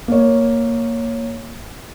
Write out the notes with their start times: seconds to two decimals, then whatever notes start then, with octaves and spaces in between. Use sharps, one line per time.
0.08 A#3 C#5